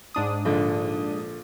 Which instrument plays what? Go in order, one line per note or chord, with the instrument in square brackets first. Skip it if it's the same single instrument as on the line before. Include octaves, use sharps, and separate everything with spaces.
[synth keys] G#2 D4 D#6
[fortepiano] A#1 D3